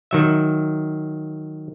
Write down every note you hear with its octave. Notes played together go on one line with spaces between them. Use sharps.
D#3 F#3 E5